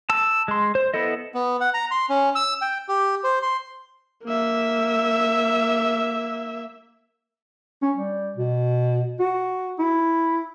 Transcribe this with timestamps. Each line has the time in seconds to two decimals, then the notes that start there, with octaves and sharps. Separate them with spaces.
0.10 A5 E6
0.48 G#3 C6
0.75 C5
0.94 B3 E4 A4 D#5
1.34 B3
1.60 F#5
1.74 A#5
1.91 C6
2.09 C#4
2.35 E6
2.62 G5
2.89 G4
3.24 C5
3.42 C6
4.24 A#3 E5
7.82 C#4
7.96 G3
8.37 B2
9.20 F#4
9.79 E4